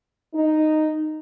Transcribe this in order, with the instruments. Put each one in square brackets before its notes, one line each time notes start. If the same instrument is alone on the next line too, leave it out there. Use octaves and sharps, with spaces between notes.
[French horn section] D#4